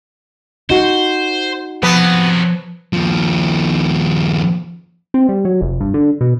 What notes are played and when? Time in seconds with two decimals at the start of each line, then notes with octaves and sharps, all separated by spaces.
0.70 D#4 F#4 C5
1.83 C3 F3 F#3 B3
2.93 D#2 F3
5.14 C4
5.29 G3
5.45 F#3
5.61 F1
5.81 G2
5.94 D3
6.21 B2